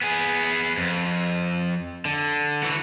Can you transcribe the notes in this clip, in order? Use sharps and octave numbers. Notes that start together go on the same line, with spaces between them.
B3 G#4
F2
D3
E3 F#4